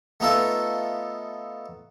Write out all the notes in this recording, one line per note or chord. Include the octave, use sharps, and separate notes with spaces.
A3 B3 D#4 F4 A4 E5